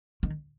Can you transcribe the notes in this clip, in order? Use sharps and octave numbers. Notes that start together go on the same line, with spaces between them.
D#3